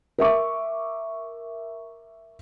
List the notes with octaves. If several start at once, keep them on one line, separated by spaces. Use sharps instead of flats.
A#4 E5 C#6 D6